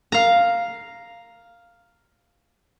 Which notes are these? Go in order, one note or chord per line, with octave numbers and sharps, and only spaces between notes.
F5 A#5